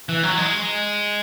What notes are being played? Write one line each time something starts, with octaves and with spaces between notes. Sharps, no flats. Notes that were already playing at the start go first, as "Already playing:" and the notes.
E3
F#3
G#3